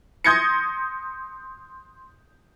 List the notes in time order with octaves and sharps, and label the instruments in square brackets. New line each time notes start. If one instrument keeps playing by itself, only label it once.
[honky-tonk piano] C6 D#6 G6 G#6 A#6 C#7